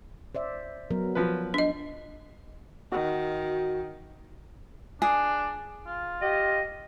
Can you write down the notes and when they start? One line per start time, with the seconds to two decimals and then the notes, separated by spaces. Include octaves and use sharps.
0.35 C5 D5 E5
0.91 F#3 B3 A#4
1.15 F3 B4
1.54 D4 D#5
2.92 D#3 F#4
5.02 D4 G#4
5.86 F4
6.22 G4 D#5